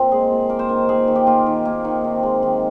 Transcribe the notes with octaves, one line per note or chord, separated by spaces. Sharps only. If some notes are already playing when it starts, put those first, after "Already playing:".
Already playing: A#2 C4
G#3 G#4
A#2
A#3 A#4
C5
D#3 A#4
A#4
A#3 G#4
D#3
G4
A#3 F4
D#3
A#3
D#3
C3
G#3
D#3